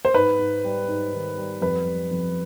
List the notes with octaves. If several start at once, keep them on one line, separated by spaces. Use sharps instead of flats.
C5
G#2 B4
G#2
G3
G#2
D#3
G3
F2 B4
G3
F2